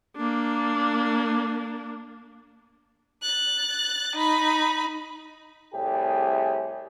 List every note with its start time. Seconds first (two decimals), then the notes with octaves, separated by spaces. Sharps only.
0.17 A#3 D4
3.22 F#6 A6
4.16 D#4 B5
5.73 C2 A2 G4 G#4